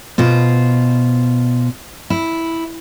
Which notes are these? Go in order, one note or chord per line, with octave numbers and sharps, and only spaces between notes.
B2 F4 C5
E4